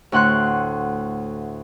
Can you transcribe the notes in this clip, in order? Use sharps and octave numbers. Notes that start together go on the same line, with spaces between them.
D2 A2 F#5 C6 F#6